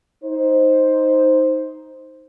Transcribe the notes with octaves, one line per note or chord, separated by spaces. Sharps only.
D#4 C5